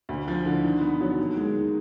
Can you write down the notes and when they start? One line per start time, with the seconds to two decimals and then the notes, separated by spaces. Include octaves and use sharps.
0.09 D2
0.28 F3
0.46 D3
0.63 D#3
0.81 B3
1.01 F#3
1.18 D#2
1.36 G#3
1.55 D#3